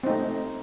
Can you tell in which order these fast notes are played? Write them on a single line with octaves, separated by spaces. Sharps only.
C4 D#4 A3